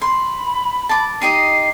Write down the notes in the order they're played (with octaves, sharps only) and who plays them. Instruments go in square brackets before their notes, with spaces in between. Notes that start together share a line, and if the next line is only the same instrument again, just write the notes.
[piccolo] B5 [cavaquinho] C6
[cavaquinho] A5 D6
[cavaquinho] D#4 G4 D#5 [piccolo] C7